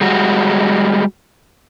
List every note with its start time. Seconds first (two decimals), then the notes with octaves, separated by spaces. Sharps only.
0.01 G3 G#3 F#4